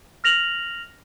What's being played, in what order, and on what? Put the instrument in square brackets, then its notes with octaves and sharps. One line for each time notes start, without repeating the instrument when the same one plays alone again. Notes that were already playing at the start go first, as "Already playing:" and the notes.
[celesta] F6 A#6 F7 F#7